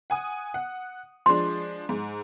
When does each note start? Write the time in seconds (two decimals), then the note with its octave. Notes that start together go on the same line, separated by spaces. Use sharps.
0.10 F#5 G#5 D#6
0.54 F#5
1.26 F3 G#3 D4 C6
1.89 G#2